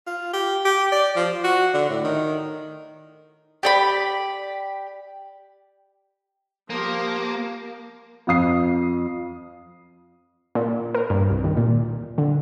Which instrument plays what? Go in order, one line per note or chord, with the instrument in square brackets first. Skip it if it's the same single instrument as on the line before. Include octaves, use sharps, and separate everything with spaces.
[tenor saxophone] F4
G4
G4
D5
F3
F#4
D3
A2
D#3
[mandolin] G4 D5 B5
[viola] F3 G4 [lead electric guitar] A#3
[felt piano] F2 F5 D#6 C7
[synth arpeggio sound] A#2
A#4
G2
C2
D#2
A#2
D3